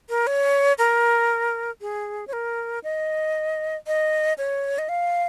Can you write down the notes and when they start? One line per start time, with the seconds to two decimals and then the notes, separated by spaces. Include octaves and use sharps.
0.09 A#4
0.27 C#5
0.78 A#4
1.81 G#4
2.27 C#5
2.33 A#4
2.84 D#5
3.87 D#5
4.38 C#5
4.78 D#5
4.89 F5